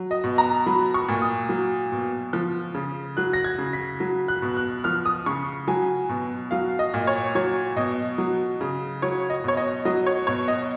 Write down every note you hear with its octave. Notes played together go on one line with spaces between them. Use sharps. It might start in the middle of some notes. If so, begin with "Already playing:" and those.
Already playing: F#3
D#5
B2
A#5
F#3 B5
C#6
A#2
D#6
F#3
B2
F3
C#3
F#3 F#6
A#6
G#6
C#3
B6
F#3
F#6
B2
F#6
F3 F6
D#6
C#3 C#6
F#3 G#5
B2
F#3 F5
D#5
A#2
C#5
F#3 C#5
B2 D#5
F#3
C#3
F#3 C#5
D#5
B2 C#5
D#5
F#3 D#5
C#5
B2 C#5
D#5